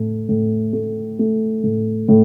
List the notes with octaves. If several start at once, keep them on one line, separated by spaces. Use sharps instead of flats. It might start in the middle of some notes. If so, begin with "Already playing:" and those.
Already playing: A2 A3
A2
A3
A3
A2
A2